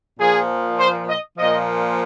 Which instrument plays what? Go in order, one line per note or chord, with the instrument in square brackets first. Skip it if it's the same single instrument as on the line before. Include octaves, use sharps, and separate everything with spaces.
[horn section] A#2 F3 G#4
C5
D#5
A#2 F3 D#5